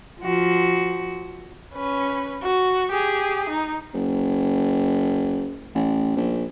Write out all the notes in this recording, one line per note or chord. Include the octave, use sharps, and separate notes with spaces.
F3 F#4
C#4 B4
F#4
G4 G#4
D#4
F#1
A1
A#1